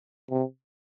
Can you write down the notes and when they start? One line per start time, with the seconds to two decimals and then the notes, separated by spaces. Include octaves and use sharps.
0.31 C3